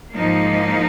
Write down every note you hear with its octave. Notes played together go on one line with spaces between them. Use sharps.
G#2 F3 A#3 D#4